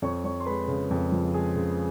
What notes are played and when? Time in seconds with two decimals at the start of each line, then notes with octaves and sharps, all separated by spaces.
0.02 F2 C#5 C#6
0.24 F3 C#5 C#6
0.40 C6
0.46 G#3 B4 B5
0.68 C#3
0.91 F2
1.12 F3
1.34 G#3 G#4 G#5
1.55 C#3